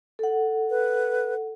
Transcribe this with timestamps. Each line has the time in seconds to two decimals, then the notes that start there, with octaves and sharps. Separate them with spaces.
0.19 A4 F#5
0.70 B4